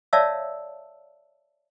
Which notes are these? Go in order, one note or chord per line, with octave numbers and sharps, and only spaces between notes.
C#5 D5 E5 F5 A5 E6